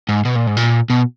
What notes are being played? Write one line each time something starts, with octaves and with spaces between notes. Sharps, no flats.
G#2
B2
A#2
G#2
A#2
B2